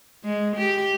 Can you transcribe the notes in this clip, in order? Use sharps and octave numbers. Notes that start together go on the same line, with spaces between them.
G#3
G4